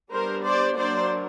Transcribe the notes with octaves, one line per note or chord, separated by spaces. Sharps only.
G3 B3 D4 A#4 C5
C5 D5
F#3 A#3 D4 C5 D5